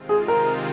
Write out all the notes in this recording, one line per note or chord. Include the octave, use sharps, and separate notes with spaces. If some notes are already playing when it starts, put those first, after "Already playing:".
Already playing: C3 D#3 G#3 C4 F4
G#4
A#4